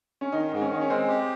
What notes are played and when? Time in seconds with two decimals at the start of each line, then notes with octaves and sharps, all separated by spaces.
0.21 C#4
0.32 D#3 D#4
0.52 G#2
0.62 C#4
0.70 D#3 D#4
0.81 C#4
0.89 G#3 C4
1.08 G4